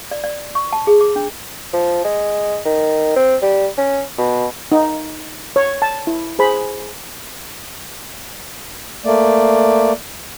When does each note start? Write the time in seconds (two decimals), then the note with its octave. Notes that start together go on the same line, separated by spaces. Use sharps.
0.11 D5
0.24 D5
0.55 C#6
0.73 A5
0.87 G#4
1.01 D6
1.16 D4
1.73 F3
2.05 G#3
2.65 D#3
3.16 C4
3.42 G3
3.78 C#4
4.18 B2
4.72 D#4
5.56 C#5
5.82 A5
6.07 E4
6.39 G#4 C5 B5
9.05 A3 A#3 D5